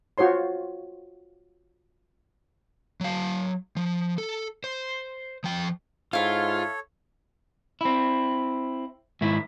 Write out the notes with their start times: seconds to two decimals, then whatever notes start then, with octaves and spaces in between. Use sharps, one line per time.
0.18 F4 F#4 C5 C#5 C6
3.01 F#3 F5
3.77 F3
4.18 A4
4.64 C5
5.44 F3 G5
6.13 G#2 E4 F4 A4 C#5 F5
7.81 C4 E4
9.21 G#2 D#3 E4